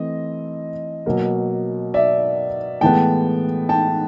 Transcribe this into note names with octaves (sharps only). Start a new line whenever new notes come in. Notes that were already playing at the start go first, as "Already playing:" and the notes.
Already playing: E3 A3 C4 D#5
B2 F#3 A#3
D5 E5
A2 E3 G#3 B3 G5 A5
G5 A5